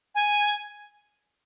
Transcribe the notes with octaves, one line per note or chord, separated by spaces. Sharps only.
G#5